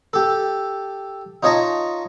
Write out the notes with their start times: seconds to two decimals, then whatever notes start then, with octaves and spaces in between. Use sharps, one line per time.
0.13 G4 A4
1.43 D#4 F4 C#5 D#5 A5 A#5